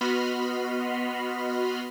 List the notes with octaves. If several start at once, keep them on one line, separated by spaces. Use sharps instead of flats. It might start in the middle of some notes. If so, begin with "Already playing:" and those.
B3 F#4 D#5 B5 C6 F6